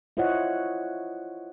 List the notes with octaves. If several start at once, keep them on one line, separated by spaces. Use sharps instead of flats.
E4 F4 C5 C#5 D#5 F#5